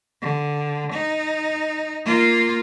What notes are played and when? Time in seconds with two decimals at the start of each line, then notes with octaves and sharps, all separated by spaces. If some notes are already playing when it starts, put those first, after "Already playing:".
0.22 D3
0.92 D#4
2.05 A#3 F4